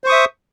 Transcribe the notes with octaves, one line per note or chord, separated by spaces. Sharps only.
C5 E5 C#6 D#6